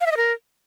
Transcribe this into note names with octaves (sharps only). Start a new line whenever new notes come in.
F5
E5
D#5
A#4